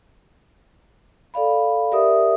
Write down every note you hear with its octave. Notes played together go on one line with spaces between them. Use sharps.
A4 D5 F5 B5
G4 A#4 D5 E5 D#6